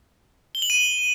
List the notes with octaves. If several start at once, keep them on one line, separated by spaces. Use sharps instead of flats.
G7
F#7
D#7